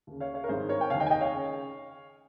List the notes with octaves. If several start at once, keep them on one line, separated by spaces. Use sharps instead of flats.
D#2 C#3
C#5 F5
C#5 F5
A#4
G#1 G2 D#3 G#4 C5
A#4 C#5
G5
F1 D#2 D#3 F5 G#5
D#5 G5
G#5
D#5 G5
C#5 F5
C#3